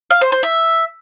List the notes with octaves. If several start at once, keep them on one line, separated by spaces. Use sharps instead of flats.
F5
C5
C5
E5